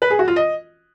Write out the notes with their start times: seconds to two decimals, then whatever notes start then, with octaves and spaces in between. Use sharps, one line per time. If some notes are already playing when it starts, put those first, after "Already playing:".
0.02 B4
0.10 G#4
0.19 F#4
0.28 F4
0.36 D#5